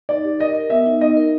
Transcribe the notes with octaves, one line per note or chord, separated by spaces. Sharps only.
D#4 D5
G4
A#4 D#5
A#4
B3 E5
D#4
D#4 D#5
A#4